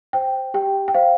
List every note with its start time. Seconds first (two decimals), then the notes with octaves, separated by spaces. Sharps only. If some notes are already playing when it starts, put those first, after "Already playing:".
0.13 C5 G5
0.54 G4 G5
0.88 G5
0.94 C5 F5